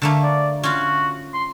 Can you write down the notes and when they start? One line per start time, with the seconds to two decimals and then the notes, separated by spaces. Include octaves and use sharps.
0.02 D3 A3 A#3
0.24 D5
0.63 C#4 F4 F#4
1.34 C6